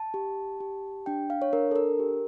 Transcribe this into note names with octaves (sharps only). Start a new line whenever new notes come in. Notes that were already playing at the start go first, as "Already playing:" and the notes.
Already playing: A5
G4
G4
D4 G5
F5
C#5
D4 A#4
A4
A#4
G4